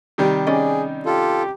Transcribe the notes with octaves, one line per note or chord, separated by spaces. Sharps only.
C3 D#3 G3
C#4 G#4 D5 D#5
F4 G4 A4